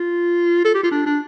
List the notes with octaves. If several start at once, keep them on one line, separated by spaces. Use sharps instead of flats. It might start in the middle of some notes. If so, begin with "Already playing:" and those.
Already playing: F4
A4
G4
F4
D4
D4